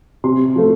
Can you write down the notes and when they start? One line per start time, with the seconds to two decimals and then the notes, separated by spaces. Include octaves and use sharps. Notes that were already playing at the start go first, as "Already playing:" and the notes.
0.24 C3 C6
0.56 F3 A3